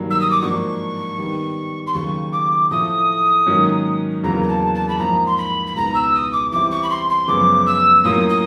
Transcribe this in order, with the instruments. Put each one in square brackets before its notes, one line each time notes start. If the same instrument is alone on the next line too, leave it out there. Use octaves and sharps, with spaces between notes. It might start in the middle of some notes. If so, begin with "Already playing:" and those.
Already playing: [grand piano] G2 D#3 F#3 A#3
[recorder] E6
D#6
D6
[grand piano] G#2 F3 A#3 D4 F#4 [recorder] C#6
[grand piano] D#3 G3 B3
[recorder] C6
[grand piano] D#2 C#3 F#3 [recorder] C#6
[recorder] D6
[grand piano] A2 F3 A3 [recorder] D#6
[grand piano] G#2 D#3 F#3 A#3 C#4
[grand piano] E2 C#3 F#3 A#3 [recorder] A#5
[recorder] A#5
A5
A5
B5
[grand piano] G#2 F3 A#3 D4 [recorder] A#5
[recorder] C6
B5
B5
[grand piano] C#2 B2 G#3 B3 D#4 [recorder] A#5
[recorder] E6
D#6
D6
[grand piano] E3 G3 C4 E4 [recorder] D6
[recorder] C#6
B5
C6
C6
[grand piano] F#2 C#3 F3 G#3 B3 [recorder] D6
[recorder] E6
[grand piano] A2 F#3 A#3 C#4 F4 [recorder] D#6
[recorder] D#6